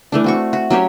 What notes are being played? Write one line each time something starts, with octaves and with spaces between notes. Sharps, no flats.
E3 A3 D4
C4 F#4 C#6
F#4
F#3 C#4 G4 C#5